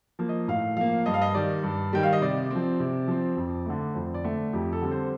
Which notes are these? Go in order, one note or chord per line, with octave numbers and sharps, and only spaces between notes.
F3 A#3
D#5
A2 F5
F3 A#3 F5
G2 D#5
F5
D#5
D#3 G3 D5
G2
D#3 G3 G5
F5
D#5
C3 D5
F3 C4
C3
F3 C4
F2
D3 A3
F2 C5
D5
D3 A3
F2 G4
A4
D3 G3 C4
C5